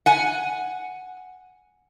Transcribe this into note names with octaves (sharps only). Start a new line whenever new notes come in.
F#5 G#5